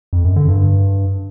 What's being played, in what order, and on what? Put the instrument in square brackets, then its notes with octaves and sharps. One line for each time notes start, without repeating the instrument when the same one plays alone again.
[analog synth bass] F2
F#2
D3
G2